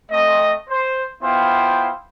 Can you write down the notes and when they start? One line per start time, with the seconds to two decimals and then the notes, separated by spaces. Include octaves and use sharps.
0.11 A3 C4 D#5
0.69 C5
1.23 B3 E4 F4 C5 F5 G5